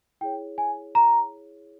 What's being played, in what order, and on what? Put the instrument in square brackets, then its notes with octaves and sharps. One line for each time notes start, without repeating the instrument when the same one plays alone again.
[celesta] E4 G#4 C#5 G5
G#5
A#5